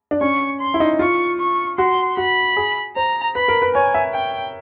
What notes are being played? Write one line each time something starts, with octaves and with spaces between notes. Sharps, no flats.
D4
C#4 C#6
C6
E4
D#4
F4 C#6
C#6
F#4 C6
F#4 B5
G#4
C5 A#5
B4 B5
A#4
B4
C#5 G#5
E5
G5